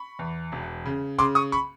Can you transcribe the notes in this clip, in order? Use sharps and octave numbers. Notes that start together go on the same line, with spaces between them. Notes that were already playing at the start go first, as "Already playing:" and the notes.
Already playing: B5 C#6
E2
E1
C#3
C#3 C6 D6
C#6 D#6
B5 C#6